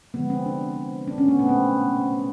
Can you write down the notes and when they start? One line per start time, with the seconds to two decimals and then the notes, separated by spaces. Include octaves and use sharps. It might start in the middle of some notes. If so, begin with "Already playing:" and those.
0.14 D3 F3 G#3 B3
0.30 C4
0.46 D4
1.08 D4
1.18 C#4
1.28 B3
1.39 A#2 F#3 A3 B3
1.49 C4